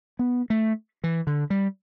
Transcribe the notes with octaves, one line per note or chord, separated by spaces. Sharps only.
B3
A3
E3
D3
G3